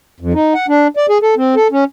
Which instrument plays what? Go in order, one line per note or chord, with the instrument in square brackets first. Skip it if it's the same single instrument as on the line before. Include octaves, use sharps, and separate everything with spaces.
[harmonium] F2
D#4
F#5
D4
D5
G#4
A4
C4
A4
C#4